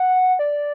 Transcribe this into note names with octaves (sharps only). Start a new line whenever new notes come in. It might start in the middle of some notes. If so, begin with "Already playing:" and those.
Already playing: F#5
D5